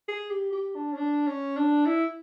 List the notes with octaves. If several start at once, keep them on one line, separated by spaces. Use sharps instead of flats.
G#4
G4
G4
D4
C#4
D4
C#4
D4
E4